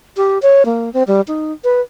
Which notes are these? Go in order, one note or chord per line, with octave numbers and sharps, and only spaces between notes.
G4
C#5
A#3
C4
G3
D#4
B4